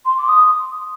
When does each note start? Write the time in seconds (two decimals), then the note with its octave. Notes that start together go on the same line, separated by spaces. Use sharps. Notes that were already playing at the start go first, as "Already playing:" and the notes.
0.05 C6
0.17 D6
0.28 D#6